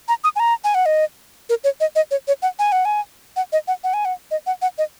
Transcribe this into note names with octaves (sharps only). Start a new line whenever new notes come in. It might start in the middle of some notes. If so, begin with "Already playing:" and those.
A#5
D#6
G#5
A#5
G#5
F#5
D#5
A#4
C#5
D#5
D#5
C#5
C#5
F#5
G#5
F#5
G#5
F#5
D#5
F#5
F#5
G#5
F#5
D#5
F#5
F#5
D#5